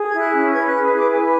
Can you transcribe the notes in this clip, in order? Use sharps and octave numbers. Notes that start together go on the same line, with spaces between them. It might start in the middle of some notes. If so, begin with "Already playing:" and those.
Already playing: G#4
E4 G#6
F#6
C#4
B4 G#6
F#6
G#4
E4
D6
B4 G#5